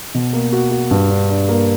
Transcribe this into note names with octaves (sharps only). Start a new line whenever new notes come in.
B2
A#3
F#4
F#4
G2
D4
D4
A#3